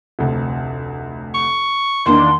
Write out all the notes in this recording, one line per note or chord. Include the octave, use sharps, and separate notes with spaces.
F1 D2 C3
C#6
E2 D#3 A#3 D4 C6